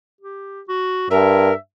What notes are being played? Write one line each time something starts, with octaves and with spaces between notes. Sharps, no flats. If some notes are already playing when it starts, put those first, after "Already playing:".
G4
F#4
G2 A#4 E5